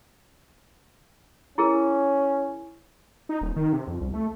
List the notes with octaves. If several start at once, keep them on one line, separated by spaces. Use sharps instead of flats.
C#4 E4 G#4 A#4
D#4
D#1
D#3
C3
F2
C2
A3